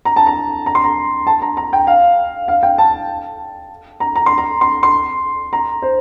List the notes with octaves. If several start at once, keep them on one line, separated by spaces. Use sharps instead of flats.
A#5
A5
A#5
A#5
C6
A#5
A5
A#5
A#5
G5
F5
F5
G5
A5
A#5
A#5
C6
A#5
C6
C6
A#5
C5